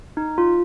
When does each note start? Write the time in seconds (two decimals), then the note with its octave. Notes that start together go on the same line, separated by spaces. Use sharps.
0.17 D#4
0.38 F4